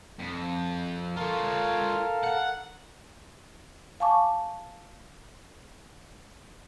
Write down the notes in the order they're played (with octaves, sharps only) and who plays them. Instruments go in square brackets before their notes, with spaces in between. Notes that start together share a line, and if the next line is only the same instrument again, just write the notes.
[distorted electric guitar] F2
[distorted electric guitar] F4 C#5 [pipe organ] A4 A#4 F5
[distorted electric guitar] F#5
[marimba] F5 G#5 A5 C#6 D6